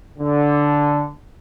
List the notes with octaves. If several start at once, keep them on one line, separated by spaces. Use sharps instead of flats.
D3